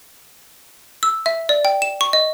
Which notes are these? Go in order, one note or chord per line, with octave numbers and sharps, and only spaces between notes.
E6
E5
D5
G5
E7
C#6
D#5